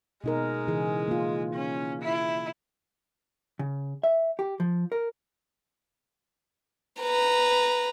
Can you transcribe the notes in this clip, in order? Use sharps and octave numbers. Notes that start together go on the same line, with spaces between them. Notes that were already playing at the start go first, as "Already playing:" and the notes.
B2 G#3 D#4 A#4
C#3 E3 G#4
A#3 F4
C#4
E4
C#3
E5
G4
F3
A#4
B4 A#5